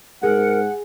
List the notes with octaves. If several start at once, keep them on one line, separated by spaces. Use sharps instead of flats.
G#2 G#4 A#4 F#5